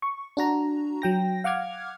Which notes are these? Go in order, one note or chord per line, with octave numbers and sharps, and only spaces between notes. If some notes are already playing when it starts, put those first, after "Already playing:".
C#6
D4 F#4 A#5
F#3 G5 A#6
F5 F#5 D6 F6 G#6